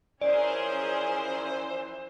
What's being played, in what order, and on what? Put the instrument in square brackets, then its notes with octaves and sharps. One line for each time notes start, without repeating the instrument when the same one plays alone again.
[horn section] E3 F3 C5 [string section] C#4 G#4 A#4 [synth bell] D5